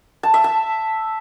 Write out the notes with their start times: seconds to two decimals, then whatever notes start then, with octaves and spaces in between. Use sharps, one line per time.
0.23 A5
0.34 E5
0.44 A5